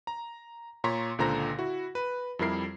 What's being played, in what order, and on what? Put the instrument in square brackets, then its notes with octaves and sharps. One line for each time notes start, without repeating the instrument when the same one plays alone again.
[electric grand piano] A#5
A#2 C#5 A#5 C6 C#6 B6
C#2 A#2 D3 C5 A#5 A#6
E4 F#4
B4
F2 G3 E4 A#4 C7